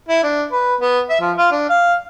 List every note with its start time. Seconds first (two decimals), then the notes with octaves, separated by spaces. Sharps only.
0.08 E4
0.23 D4
0.52 B4
0.81 B3
1.09 E5
1.21 F3
1.37 F4
1.52 D4
1.69 F5